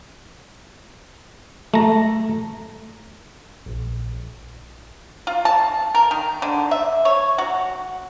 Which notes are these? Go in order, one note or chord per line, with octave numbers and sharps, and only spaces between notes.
A3 A#5
A#1
F4
A5
A#4
D#3
D3
E5
C#5
F#4